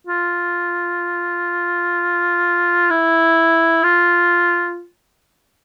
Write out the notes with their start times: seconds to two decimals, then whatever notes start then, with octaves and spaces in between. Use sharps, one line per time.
0.07 F4
2.90 E4
3.83 F4